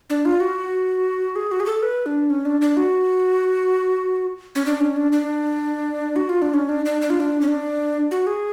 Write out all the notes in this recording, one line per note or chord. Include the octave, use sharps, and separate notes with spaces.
D4
F4
F#4
G#4
F#4
G#4
A4
B4
D4
C#4
D4
D4
F#4
C#4
D4
C#4
D4
D4
F#4
F4
D4
C#4
D4
D4
D4
F4
D4
C#4
D4
F#4
G#4